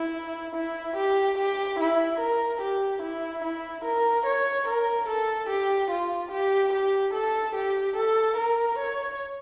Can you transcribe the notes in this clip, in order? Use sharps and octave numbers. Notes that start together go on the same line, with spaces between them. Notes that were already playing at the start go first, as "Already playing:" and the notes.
Already playing: E4
E4
G4
G4
E4
A#4
G4
E4
E4
A#4
C#5
A#4
A4
G4
F4
G4
G4
A4
G4
A4
A#4
C#5